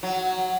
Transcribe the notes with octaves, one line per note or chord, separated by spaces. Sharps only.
F#3